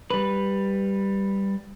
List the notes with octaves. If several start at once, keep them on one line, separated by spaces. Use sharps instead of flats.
G3 B4